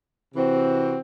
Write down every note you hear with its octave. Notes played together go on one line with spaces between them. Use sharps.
C3 E3 C4 F#4